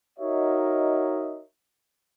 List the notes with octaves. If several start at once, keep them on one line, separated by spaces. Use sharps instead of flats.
D#4 F#4 A#4 C#5 D#5 E5